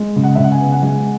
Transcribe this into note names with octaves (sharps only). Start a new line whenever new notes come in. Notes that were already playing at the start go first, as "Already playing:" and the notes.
Already playing: G#3
C#3
F#5
C#3 E5
F#5
G#5
B3
F#5
G#3 G#5